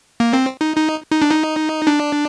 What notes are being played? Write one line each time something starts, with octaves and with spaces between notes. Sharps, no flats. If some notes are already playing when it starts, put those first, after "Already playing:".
A#3
C4
D#4
D#4
D#4
D4
D#4
D4